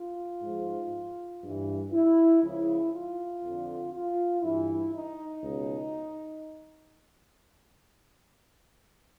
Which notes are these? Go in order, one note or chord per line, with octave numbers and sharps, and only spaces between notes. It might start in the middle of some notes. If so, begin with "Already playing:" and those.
Already playing: F4
G#2 F3
G2 E3
E4
C#2 C#3 F3 E4
F4
F2 D3 F3
F4
G2 E3 E4
D#4
C#2 B2